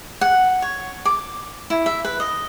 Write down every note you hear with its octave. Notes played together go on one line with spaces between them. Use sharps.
F#5
C#5
D6
E4
E5
B4
D#5